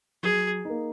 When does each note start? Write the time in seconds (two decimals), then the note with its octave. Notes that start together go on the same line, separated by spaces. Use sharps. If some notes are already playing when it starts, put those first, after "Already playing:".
0.23 F#3 G#4
0.65 A#3 D#4